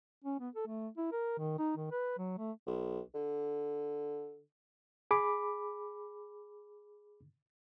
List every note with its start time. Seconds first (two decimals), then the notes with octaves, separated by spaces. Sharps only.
0.24 C#4
0.40 B3
0.55 A4
0.67 A3
0.97 E4
1.12 A#4
1.39 D#3
1.59 D#4
1.77 D#3
1.91 B4
2.18 F#3
2.38 A3
2.67 B1
3.15 D3
5.11 G#4 B5 D6